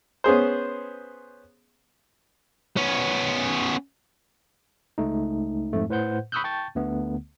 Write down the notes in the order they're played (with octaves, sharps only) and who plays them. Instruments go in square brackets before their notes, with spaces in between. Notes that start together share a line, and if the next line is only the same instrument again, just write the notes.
[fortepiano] B3 C#4 G#4 C5
[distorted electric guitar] B3 C#4
[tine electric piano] C#2 A3 D#4
F2 G#2 A3
A2 B4 C5 F#5 G6
B5 C#6 D#6 E6 F#6 G6
G5 A5 C#6 G6 A6
D2 D3 A3 B3